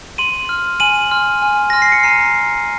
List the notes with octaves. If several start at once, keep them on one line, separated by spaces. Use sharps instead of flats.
C6 D#7 F#7
F6
G#5 D#7 F#7
C6 F6
G#5
C6 F6 A#6
C7
C#7
A#5 C7 D#7